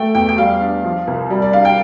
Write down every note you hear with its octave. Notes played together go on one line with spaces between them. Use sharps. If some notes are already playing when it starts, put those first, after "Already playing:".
Already playing: A3 G5
E2 G5
G5
G3 F5
D4
F3
C2
G3
D5
D4 F5
G5